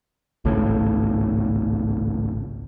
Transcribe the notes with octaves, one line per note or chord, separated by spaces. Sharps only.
G#1 C#2 A2